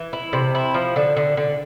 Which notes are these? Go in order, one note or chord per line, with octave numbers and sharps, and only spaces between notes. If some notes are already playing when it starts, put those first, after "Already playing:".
Already playing: E3
E4
C3
E4
F3
D3
D3
D3